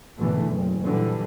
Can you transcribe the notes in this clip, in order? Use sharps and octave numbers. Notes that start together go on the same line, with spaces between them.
G#1 E2 B2 D3 E3 A3
F#1
A#2 D3 E3 G3